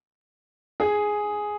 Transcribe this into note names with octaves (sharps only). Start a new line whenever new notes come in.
G#4